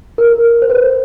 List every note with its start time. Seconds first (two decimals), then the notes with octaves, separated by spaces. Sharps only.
0.18 A#4
0.62 C5
0.70 B4